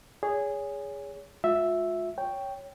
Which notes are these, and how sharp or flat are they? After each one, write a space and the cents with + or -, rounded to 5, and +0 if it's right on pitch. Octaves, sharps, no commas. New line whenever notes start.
G#4 -10 C#5 +30
G#3 +0 F4 +40 E5 +0
C#5 +5 G5 +0